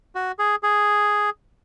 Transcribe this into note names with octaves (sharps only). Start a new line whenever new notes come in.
F#4
G#4
G#4